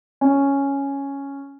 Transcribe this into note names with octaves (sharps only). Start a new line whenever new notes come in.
C#4